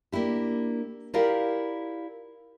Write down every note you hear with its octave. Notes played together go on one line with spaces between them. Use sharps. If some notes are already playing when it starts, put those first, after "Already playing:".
A#3 D4 E4 G4
E4 F4 G4 A#4 D5 F5